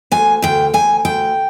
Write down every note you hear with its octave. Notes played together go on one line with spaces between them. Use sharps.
D2 G#5
D2 G5
D2 G#5
D2 G5